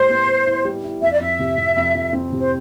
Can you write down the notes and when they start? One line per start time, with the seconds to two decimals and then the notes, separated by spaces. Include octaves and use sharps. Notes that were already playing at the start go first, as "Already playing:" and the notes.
Already playing: A2 G3 E4 C5
0.09 B3
0.27 G3
0.46 E4
0.65 G3
0.83 E4
1.02 F2 E5
1.12 D5
1.20 F2 E5
1.39 C3
1.57 C3
1.76 F2
1.94 F2
2.13 C4
2.32 C3
2.40 C5